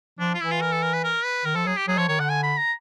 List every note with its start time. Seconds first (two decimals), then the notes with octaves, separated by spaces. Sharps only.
0.19 F3 D4
0.34 F4
0.40 E3 E4
0.51 F4
0.61 A#4
0.72 A4
0.82 A#4
0.93 B4
1.04 A#4
1.24 B4
1.45 D#3 A#4
1.56 F3 A4
1.66 F#3 G#4
1.77 G4
1.88 F#3 G#4
1.98 F3 C#5
2.09 D#3 C#5
2.19 D3 F#5
2.29 G#5
2.43 B5
2.57 A#5